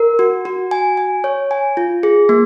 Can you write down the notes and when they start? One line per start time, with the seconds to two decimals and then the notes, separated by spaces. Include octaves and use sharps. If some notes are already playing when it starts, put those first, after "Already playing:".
Already playing: A#4
0.19 F#4
0.45 F#4
0.71 G#5
0.97 G#5
1.24 C#5
1.51 G#5
1.77 F4
2.03 G#4
2.29 A#3